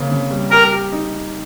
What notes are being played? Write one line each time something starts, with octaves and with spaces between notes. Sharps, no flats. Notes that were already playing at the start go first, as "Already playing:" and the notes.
Already playing: C#3 A#3 C4
C#3
G3
G4 A#4
G4
D#4